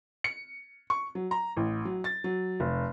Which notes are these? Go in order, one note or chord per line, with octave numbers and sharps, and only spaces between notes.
C#7
C#6
F#3
A#5
A1
F#3
A6
F#3
F1